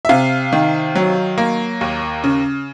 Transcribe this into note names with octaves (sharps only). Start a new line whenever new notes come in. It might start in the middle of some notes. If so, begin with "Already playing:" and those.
E5
C3 F5
D#3
F#3
A#3
D#2
C#3